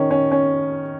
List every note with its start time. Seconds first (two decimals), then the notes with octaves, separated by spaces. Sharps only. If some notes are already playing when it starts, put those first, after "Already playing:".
Already playing: D#3 C#4
0.11 C#4
0.31 C#4